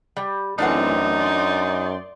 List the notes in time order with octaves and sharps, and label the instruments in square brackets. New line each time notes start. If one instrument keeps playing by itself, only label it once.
[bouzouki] G3
[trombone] F#2 [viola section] E3 A3 C4 [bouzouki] D4 F5 F#5 [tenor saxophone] D#4
[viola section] D5 C6